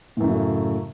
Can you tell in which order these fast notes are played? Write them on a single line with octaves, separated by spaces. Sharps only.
A2 F#2 C#3 F#3 A3